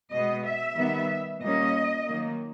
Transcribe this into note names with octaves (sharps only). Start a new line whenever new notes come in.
B2 G#3 B3 D#5
E5
D#3 G3 B3
A#2 G3 A#3 C#4 D#5
D#3 F#3 A#3